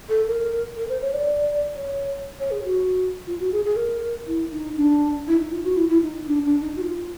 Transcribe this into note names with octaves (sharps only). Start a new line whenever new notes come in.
A4
A#4
A#4
C5
C#5
D5
C#5
C#5
G#4
F#4
F4
F#4
G#4
G#4
A#4
E4
D#4
D4
E4
D#4
F4
F#4
E4
E4
D#4
D4
D4
D#4
F#4
F4